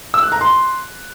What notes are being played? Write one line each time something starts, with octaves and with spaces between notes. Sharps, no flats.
E6
F#6
A#5
C6